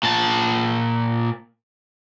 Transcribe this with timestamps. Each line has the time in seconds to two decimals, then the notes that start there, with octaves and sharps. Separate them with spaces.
0.03 A#2 A5